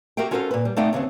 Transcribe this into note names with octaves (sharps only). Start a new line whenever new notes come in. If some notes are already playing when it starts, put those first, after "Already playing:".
F#4 G4 A#4 E5 F5 G5
C#4 F4 F#4 A4 A#4 C5
A#2 B4
G3
A3 B3 D#4 D5 F5 G5
D#2 C#3 B3 C4